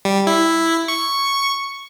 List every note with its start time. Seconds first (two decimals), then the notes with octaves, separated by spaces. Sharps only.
0.05 G3
0.27 E4
0.88 C#6